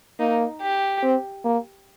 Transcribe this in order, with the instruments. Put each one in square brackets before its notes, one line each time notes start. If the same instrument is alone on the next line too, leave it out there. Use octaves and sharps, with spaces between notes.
[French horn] A#3 [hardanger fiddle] D#4
[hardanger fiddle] G4
[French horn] C4
A#3